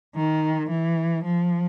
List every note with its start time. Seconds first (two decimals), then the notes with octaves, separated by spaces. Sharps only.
0.15 D#3
0.70 E3
1.24 F3